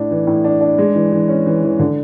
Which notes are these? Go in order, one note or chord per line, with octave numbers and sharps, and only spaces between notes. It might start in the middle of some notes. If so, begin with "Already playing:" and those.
Already playing: A2 D4
E3
A2
D4
D4
G#3
E3
E3
C#4
E3
E3
D3